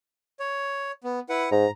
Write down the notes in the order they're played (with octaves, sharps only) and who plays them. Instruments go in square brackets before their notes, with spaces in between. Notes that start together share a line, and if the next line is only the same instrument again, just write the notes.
[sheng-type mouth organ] C#5
B3
E4 B4 F#5
[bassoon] G#2 [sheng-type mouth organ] A#5